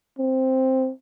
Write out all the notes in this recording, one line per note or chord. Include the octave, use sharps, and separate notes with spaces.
C4